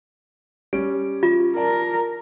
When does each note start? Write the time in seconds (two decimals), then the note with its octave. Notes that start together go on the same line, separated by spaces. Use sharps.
0.73 G3 C#4 D7
1.23 F4
1.56 A#4 D5 A5